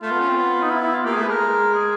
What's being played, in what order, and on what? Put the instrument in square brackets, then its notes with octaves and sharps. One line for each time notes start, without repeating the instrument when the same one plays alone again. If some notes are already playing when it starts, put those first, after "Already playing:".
[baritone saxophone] A3 [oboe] F4
[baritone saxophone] B3
C#4
C4
B3
[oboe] D#4
E4
E4
F4
[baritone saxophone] A#3 [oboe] G4
[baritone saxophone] A3 [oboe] G#4
[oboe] B4
[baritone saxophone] G#3 [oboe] A#4
[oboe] G#4